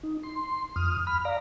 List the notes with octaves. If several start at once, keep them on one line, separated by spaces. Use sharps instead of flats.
D#4
C6
F2 D#6 F6
B5 F6
D5 F5 A#5